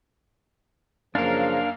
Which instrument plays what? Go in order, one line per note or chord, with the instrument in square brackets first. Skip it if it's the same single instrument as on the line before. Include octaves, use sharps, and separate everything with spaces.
[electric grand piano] F#2 A#3 [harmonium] C#3 F3 [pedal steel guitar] D4 A#4 [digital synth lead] F5